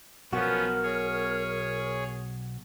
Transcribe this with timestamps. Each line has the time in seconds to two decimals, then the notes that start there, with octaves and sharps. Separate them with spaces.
0.33 B1 B2 F3 B3 C#4 F#4 A#4
0.83 G#4 C#5